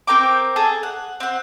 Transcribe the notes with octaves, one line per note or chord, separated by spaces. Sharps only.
C4 A#4 G5 D6
G#4 A4
F#5
C4 F#5